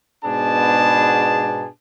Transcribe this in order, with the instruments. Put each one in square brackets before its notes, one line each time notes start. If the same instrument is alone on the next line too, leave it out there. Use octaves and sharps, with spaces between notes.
[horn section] G#2 B2 B3 D4 G#4 A5